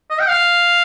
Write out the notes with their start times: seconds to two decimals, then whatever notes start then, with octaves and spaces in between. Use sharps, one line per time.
0.10 D#5
0.20 G5
0.29 F5